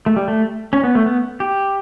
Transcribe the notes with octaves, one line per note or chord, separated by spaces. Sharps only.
A3
G3
A3
C#4
B3
A3
B3
G4